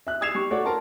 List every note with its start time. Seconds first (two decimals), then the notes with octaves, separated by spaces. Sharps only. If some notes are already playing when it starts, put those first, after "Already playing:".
0.07 E5 F#6
0.21 D#6 E6 G#6 C7 E7 F7
0.35 G3 C#6
0.51 A3 F#4 C#5 D5 F#5
0.65 A#4 A5 C6